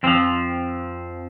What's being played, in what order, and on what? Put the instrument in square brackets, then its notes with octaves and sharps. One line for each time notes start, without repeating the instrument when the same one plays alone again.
[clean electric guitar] F2 F3 C4